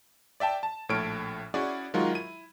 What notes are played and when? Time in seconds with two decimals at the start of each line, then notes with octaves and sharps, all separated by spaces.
0.40 D5 E5 G5 A5
0.63 A5
0.89 A#1 A2 A4 C#5 F6 D7
1.54 C#4 E4 F#4 G#4 C#5 D5
1.94 D#3 F#3 G#3 F4 F#4 A#4
2.13 E4 D#7